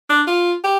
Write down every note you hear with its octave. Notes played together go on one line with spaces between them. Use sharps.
D4
F4
G4